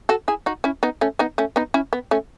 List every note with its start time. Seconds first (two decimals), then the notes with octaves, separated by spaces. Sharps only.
0.09 F#4 A4
0.28 E4 G#4
0.46 D#4 F#4
0.64 C#4 E4
0.83 B3 D#4
1.01 A3 C#4
1.19 B3 D#4
1.38 A3 C#4
1.56 B3 D#4
1.74 C#4 E4
1.93 B3
2.11 A3 C#4